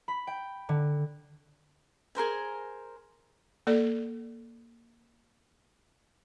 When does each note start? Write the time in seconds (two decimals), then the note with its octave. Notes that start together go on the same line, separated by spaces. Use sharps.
0.08 B5
0.27 G5
0.69 D3
2.15 G#4 A#4 C5 G#5
3.67 A#3 A4 D5